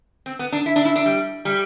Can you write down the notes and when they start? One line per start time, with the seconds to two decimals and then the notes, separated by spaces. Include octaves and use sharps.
0.26 C4
0.39 B3
0.52 D4
0.66 E4
0.76 D4
0.85 E4
0.96 D4
1.06 G3
1.45 G3